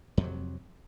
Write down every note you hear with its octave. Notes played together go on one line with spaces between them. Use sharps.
F2 C3 F#3